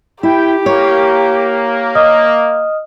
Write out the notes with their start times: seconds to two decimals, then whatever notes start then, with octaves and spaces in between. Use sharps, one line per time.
0.23 E4 G4 G5
0.66 A#3 C#5
1.95 D#5 D#6 F6